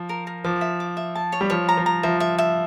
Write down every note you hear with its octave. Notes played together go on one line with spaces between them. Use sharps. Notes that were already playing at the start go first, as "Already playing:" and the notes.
Already playing: F3
A#4
A#4
F3 D6
E5
D6
E5
A5
C#5
G3
F3 C#5
A#5
F3
A#5
F3 E5
E5
E5